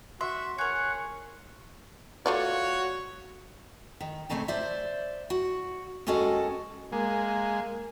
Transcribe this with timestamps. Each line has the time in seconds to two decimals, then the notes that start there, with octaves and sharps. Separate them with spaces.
0.21 F#4 E5 C6
0.58 G#4 A#4 C#5 F#5
2.26 A3 F4 F#4 C#5 D5
4.01 D#3
4.30 A#2 C#3 A3 C4 D#4
4.48 C5 D5 E5
5.30 F#4
6.07 D#2 G#3 C#4 F#4 A4 D#5
6.92 G#3 A#3